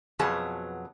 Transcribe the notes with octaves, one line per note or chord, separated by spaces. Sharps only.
F2 B2 F#3 B3 G#4 A5